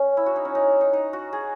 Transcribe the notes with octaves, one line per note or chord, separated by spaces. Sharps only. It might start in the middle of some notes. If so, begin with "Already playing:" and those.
Already playing: C#4
E4
F#4
D#4
C#4
D#4
D#4
D#4
F#4
G#4